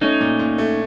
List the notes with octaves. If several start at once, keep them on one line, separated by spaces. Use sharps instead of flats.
A3 C#4 D#4
A#2
A#2
A3